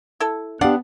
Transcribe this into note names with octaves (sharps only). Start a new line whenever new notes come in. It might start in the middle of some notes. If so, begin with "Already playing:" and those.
E4 A4
B3 D4 G4 D5 F5 F#5